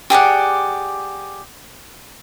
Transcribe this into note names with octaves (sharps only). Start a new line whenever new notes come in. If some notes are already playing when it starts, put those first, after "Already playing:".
G4 G#4 D5 F#5